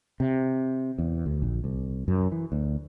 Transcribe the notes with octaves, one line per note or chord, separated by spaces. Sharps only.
C3
E2
D2
A#1
C2
F#2
E3
D2